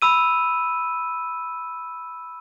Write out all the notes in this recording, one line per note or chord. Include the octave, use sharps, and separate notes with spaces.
B5 E6 D#7